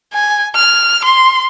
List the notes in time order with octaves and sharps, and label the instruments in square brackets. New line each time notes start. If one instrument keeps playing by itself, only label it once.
[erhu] G#5
F6
C6